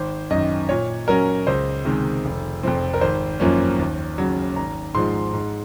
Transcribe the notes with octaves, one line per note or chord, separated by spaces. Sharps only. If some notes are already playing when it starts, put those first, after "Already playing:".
Already playing: G#1 C5
F#2 D#3 D#5
A#2 C#5
F#3 C#4 A#4
C#2 C5
C3 D#3 G#3
F1
F2 C3 F3 C4
A#4
G#1 C5
F#2 F3 A#3 C#4
D#2
C#3 F#3
G#1 A#5
G#2 F3 G#3 C6
G#2